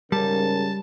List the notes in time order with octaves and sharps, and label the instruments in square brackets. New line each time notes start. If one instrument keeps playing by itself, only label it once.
[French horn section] G#2 C#3 A#4 [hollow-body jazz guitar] G3 [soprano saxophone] A5